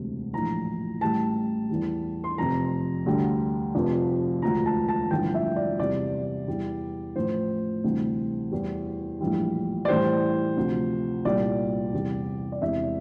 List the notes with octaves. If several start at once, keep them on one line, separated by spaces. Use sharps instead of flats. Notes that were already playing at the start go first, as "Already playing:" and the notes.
Already playing: E1 D2 C3
A#1 A2 E3 A#5
A1 A2 G3 A5
E2 E3 G3
C6
F1 F2 C3 A#5
D2 D3 G3
F1 F2 C3 F3
E1 D2 D3 F3 A#5
A5
A5
A1 G2 D3 F3 G5
E5
D5
E2 C3 G3 D5
E2 E3 G3
A1 A2 F3 C5
D2 C3 E3 G3
E2 E3 G3
A#1 A2 E3 G3
D5
A1 A2 E3 G3 C5
D2 C3 F3
C2 A#2 G3 D5
E2 C3 G3
D5
E1 E2 C3 E3 E5